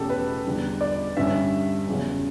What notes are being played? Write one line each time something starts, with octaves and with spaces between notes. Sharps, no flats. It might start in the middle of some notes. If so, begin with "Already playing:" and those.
Already playing: E2 B2 A3 C#4 G4 A4
B4
E2 D3 G3
D5
G2 D3 G3 C#4 E5
E2 C#3 F#3 C#4